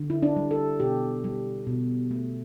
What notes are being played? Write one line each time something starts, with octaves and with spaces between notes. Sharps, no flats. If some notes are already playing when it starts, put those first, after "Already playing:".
Already playing: D3
E4
D4
G3
A4
B2 G4
G3
B2
A3